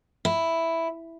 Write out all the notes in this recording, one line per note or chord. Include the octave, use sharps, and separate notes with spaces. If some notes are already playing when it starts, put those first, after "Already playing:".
E4